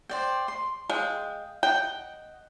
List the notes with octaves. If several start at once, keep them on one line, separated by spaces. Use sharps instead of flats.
C5 D5 G5
C6
G#3 F5 G5
D#5 F#5 G5